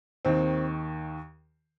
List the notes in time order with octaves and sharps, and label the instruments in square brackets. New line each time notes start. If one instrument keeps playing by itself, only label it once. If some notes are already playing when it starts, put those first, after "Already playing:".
[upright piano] D#2 D#3 C4